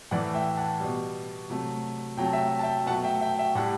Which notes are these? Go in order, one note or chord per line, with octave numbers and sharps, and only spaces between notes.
A2 E3 A3 D5 F#5
E5 G5
F#5 A5
B2 G3
C3 F#3 A3
C3 F#3 A3 G5
A5
E5 G5
A5
E5 G5
B2 F#3 A3 F#5 A5
E5 G5
E5 G5
E5 G5
A2 G3 F#5 A5